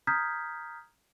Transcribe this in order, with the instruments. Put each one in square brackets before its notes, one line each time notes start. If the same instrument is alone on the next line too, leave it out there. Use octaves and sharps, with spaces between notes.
[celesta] A#5 D#6 F6 G6 G#6 B6